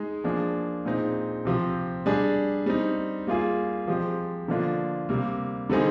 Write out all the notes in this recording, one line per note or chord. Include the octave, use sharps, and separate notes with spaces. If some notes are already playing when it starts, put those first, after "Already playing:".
Already playing: G#3 D#4 G#4
F3 A#3 D4 G#4
A#2 G#3 C4 D#4
C3 F3 C4 G4
G3 D4 G#4
G3 C4 D#4
G3 A#3 F4 G#4
F3 G#3 C4 G4
D3 F3 A#3 D4 F4
C3 G3 A#3
D3 G3 C4 D#4 G#4